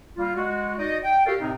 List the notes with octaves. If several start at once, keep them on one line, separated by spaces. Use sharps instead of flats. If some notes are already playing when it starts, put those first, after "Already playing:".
G3 A#3 F4
G#3 F#4
D#4 F#4 D5 D#5
G5
F#4 G4 A4 A#4 D5 F5
A2 C3 C4 D#4